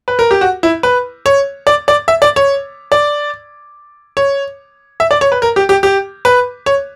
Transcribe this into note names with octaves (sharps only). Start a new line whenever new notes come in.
B4
A#4
G4
F#4
E4
B4
C#5
D5
D5
E5
D5
C#5
D5
C#5
E5
D5
C#5
B4
A#4
G4
G4
G4
B4
C#5